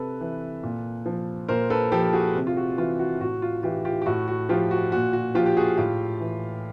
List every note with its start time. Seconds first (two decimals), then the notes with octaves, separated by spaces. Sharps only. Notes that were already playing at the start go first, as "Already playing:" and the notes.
Already playing: C3 A4 B4
0.21 E3
0.63 A#2
1.06 F3
1.49 A#2 A#4 C5
1.70 A4 B4
1.92 F3 G4 A4
2.13 F#4 G#4
2.35 C3
2.47 F4
2.57 F#4
2.77 E3 F4
2.99 F#4
3.20 A2 F#4
3.42 F4
3.63 E3 F4 G4
3.85 F4 G4
4.02 G4
4.06 A2 F#4
4.28 F#4
4.49 F3 F4 G4
4.71 F#4
4.92 A#2 F#4
5.13 F#4
5.35 F3 F4 G4
5.46 G4
5.57 F#4 G#4
5.78 A2 F4 G4
6.20 E3